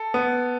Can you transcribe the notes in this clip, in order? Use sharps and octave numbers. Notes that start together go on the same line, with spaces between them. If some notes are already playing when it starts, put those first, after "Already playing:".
Already playing: A4
B3